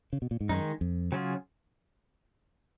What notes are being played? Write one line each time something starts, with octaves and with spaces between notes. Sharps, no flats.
C#3
B2
A#2
G#2
F#2 D#3 G#3 D#4
F2
C#3 F#3 C#4 F4 G#4